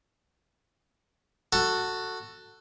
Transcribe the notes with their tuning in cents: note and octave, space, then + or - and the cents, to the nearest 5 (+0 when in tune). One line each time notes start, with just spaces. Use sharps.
F#4 +0 A4 +15